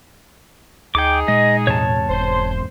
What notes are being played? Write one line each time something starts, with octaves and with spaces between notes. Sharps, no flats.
D2 D#4 G#4 G5 D6
A#2 G#3 D#5
E2 G#2 C3 C#5 A5
F1 C5